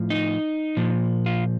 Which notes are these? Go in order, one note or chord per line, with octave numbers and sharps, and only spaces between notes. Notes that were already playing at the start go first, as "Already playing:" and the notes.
Already playing: A2 F3
D#4
A#2 F3
F4